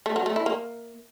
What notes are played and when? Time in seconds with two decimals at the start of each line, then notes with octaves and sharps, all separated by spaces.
0.06 A3
0.16 F#3
0.26 A3
0.36 E4
0.46 A#3